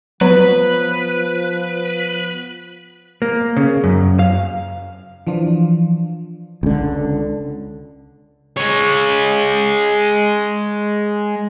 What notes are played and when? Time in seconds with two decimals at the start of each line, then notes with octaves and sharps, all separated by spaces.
0.21 F3 F#3 B3 B4
3.22 A#3
3.57 C#3
3.84 F#2
4.19 F5
5.27 E3 F3 D4 F4
6.63 C#2 D3
8.57 G#3 C#5